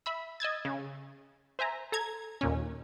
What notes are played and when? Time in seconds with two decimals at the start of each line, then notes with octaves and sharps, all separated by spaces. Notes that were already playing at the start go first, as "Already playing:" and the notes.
0.06 E5 B5 E6
0.40 D#5 E6 G#6 A6
0.65 C#3
1.59 C5 E5 G#5 A#5
1.92 A4 A#5 G#6
2.41 D#2 A#2 C#4